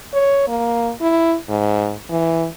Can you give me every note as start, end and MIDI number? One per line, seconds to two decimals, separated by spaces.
0.14 0.43 73
0.48 0.91 58
1.01 1.36 64
1.49 1.95 44
2.10 2.46 52